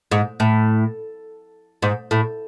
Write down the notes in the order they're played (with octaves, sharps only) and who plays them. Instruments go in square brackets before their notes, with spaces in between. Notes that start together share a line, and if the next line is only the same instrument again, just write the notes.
[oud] G#2
A2
G#2
A2